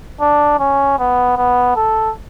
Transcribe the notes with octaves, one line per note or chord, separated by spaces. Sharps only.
D4
C#4
B3
B3
A4